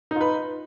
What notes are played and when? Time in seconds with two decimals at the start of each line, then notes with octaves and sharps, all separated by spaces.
0.11 D#4
0.16 F4
0.21 B4